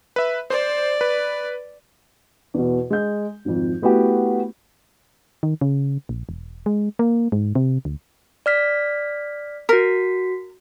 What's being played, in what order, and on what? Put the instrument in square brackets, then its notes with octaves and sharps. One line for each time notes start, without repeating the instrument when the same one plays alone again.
[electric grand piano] B4 E5
[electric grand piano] C5 [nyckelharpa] D5
[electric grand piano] B4
[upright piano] E2 B2
G#3 G6
G#1 F2
A3 B3 E4 F#4 G4
[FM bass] D#3
C#3
A#1
E1
G#3
A#3
G#2
C3
D2
[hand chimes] D5 F6 B6
[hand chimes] F#4 B6 [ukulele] A#4